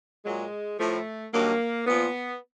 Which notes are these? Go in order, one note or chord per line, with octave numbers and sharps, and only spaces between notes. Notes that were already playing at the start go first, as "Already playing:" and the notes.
A#2 F#3 G#3
A2 F3 A3
G2 D#3 F#3 A#3
A#2 F3 B3